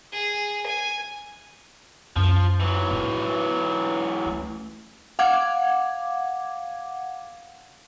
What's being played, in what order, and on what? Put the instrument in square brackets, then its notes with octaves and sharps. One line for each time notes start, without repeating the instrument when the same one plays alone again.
[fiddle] G#4
G#5
[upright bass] F#2 F4 [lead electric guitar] F3
[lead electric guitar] E3 F#3
[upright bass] A2
A3 C#4
[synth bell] F5 F#5 D6 G#6